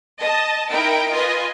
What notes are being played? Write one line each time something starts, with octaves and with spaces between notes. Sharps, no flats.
D#5 A5
D#4 E4 A#4 G5 D7
F4 B4 D#5 G#5